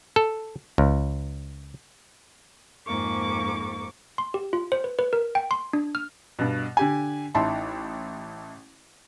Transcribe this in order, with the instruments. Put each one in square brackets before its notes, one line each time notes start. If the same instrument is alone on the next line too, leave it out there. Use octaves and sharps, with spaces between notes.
[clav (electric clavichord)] A4
C#2
[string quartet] F2 G#2 A#3 C#6 D6
[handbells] C6
G4
F4
C5
B4
B4
A#4
G5
C6
D4
F6
[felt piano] G2 B2
D3 G4 G#5
A1 D#4 E4 A5 C6